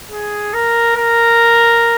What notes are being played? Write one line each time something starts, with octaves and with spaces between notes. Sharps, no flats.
G#4
A#4
A#4